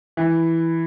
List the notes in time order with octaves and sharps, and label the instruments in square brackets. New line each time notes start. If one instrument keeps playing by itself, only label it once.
[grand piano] E3